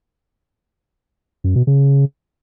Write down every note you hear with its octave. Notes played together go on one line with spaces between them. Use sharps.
F#2
B2
C#3